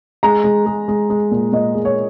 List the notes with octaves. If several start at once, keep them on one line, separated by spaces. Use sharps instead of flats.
G#3 A#5
G#3
G#3
G#3
G#3
A#2
A#2 D#5
G#3
C#5